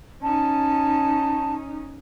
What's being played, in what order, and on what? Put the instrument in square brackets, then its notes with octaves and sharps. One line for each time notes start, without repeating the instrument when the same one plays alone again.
[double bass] C#4 D#4 [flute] A5